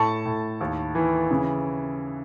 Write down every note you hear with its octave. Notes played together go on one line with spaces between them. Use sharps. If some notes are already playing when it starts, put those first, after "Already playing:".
Already playing: A2 A5 C#6
A2
D#2
E3
C#3